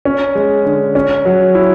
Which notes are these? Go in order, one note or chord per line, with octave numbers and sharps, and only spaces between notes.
C#4
G#3
D3
C#4
F#3
E4